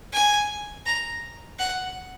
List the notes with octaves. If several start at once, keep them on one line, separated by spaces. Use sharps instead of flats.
G#5
A#5
F#5